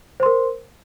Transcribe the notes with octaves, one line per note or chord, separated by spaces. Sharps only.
A#4 C5 C6